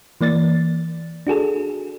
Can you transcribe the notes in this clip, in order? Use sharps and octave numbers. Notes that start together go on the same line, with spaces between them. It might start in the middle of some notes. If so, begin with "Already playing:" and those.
E3 A#3 D5 A6
D4 F#4 G#4 A4